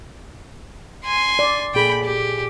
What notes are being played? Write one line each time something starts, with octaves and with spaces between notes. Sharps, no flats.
G#5 C6
D5
A#2 G#4 A4 G5 B5
G4